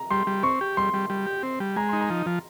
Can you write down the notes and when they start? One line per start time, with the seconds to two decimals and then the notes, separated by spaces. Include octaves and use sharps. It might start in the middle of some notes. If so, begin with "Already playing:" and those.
Already playing: A#5
0.10 G3 C6
0.27 G3
0.43 C4 C#6
0.61 G4
0.77 G3 C6
0.94 G3
1.10 G3
1.26 G4
1.43 C4
1.60 G3
1.76 G#3 A#5
1.89 D#4 C6
2.01 A#5
2.10 F3
2.26 F3